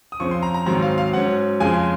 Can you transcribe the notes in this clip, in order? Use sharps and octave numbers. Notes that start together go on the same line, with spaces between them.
D#6
F2 C#3 F3 C4 C#6
C6
A#5
A#5
G#2 D#3 F#3 C4 A#5
F5
F5
G#2 F#3 C#4 F#5
F2 C#3 F3 G#3 G#5